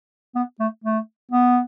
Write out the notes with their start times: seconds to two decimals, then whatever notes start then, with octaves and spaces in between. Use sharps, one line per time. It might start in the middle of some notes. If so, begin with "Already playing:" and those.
0.35 B3
0.60 A3
0.84 A3
1.31 B3